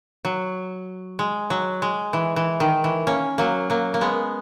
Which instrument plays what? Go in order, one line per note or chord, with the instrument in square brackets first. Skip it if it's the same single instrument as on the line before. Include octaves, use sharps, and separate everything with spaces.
[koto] F#3
G#3
F#3
G#3
E3
E3
D#3
E3
A#3 C#4
F#3 A#3
F#3 A#3
A#3
G#3 B3